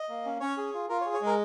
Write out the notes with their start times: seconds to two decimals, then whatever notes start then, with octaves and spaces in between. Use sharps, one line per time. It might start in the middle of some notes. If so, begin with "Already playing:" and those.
Already playing: D#5
0.09 A#3
0.25 C#4
0.40 C#4 C#5
0.57 G#4
0.74 F4
0.89 F4 A#4
1.01 C#5
1.06 G#4
1.14 C#5
1.21 G#3 A#4